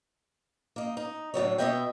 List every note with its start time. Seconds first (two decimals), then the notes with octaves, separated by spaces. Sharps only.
0.76 A#3 D#4
0.97 D#4
1.34 A2 D3 F#3 C#5
1.58 B2 G#3 B3 D#5 E5 G5